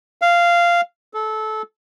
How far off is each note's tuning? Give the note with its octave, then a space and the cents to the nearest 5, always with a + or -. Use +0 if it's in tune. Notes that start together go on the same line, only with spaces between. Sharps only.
F5 -10
A4 -20